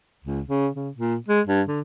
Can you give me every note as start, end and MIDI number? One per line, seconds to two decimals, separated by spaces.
0.24 0.41 37
0.48 0.69 49
0.75 0.89 49
0.96 1.16 46
1.29 1.40 56
1.47 1.62 43
1.67 1.81 50